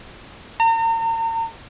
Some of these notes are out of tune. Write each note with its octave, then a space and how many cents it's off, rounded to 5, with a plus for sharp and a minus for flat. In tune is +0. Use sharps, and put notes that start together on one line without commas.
A#5 -40